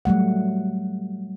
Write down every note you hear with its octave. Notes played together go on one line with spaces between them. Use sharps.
F#3 G3 A3 F#5